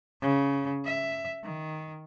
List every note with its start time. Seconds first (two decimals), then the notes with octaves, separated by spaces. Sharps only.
0.22 C#3
0.85 E5
1.44 D#3